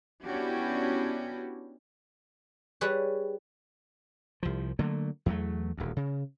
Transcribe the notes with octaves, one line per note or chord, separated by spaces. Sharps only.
B3 C#4 D4 E4 F#4 G4
G3 G#4 B4 C#5
C2 F3
D3 F#3 A3 A#3
E2 F#3 A3
D#1 D2
C#3